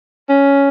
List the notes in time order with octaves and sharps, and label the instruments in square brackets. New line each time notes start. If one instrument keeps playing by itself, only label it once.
[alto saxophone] C#4